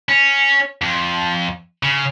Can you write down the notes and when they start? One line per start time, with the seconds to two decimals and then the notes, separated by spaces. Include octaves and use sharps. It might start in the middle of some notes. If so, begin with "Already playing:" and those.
0.09 C#4
0.82 F2
1.83 C#3